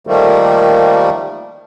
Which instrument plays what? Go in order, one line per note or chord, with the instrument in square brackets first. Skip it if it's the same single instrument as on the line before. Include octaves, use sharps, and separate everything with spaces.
[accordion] D#3 F3 G3 A3 A#3